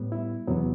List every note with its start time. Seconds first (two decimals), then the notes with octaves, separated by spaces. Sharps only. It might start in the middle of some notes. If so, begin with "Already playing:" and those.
Already playing: A2 G3 B3
0.12 E4
0.47 E2 C3 F#3 B3